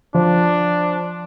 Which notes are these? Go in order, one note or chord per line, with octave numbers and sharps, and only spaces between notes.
F3 D4